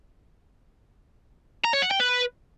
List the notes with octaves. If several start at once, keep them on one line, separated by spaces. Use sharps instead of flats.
A#5
C#5
F#5
G5
B4